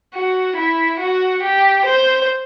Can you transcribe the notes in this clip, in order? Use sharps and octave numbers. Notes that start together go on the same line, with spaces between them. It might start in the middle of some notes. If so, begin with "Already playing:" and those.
F#4
E4
F#4
G4
C5